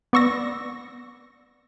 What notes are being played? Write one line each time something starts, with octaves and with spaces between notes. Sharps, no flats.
B3 D5 C#6 E6 A#6